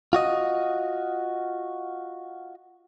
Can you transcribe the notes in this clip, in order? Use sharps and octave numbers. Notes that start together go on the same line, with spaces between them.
F4 F#4 D#5